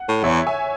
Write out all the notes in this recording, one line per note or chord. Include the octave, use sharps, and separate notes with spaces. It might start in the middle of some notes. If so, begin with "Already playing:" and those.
Already playing: F#5
A2
E2 C#5 E5
E5 G#5